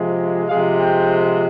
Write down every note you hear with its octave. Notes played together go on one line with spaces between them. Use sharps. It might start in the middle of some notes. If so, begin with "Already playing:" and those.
Already playing: C3 F3 G#3
C3 F3 G#3 F5
G5